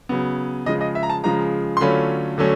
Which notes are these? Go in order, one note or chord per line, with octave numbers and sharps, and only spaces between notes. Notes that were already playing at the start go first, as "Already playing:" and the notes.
C#3 F#3 B3
C#3 F3 G#3 D#5
D#5
E5
A#5
A5
C#3 F3 G#3 A#5
C6
D3 F#3 A3 C#4 F4 B5
D3 F#3 A3 C#4